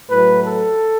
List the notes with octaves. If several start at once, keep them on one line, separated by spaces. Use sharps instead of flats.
A2 F#3 A3 B4
A4